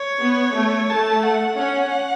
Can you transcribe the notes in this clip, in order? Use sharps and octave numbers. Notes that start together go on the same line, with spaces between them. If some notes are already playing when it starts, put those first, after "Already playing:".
Already playing: C#5
B3
A3
A3 A5
F#5
C#4 F#5